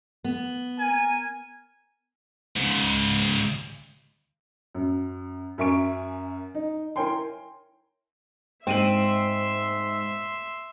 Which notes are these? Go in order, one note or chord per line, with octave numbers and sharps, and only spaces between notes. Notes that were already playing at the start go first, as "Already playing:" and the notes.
B3
A#4 G#5
G#2 C#3
F#2
F#2 A#4 E5 G#5 C#6 D7
D#4
E4 A#4 C#5 G5 G#5 C6
G#2 C4 E5 C6 D#7 F#7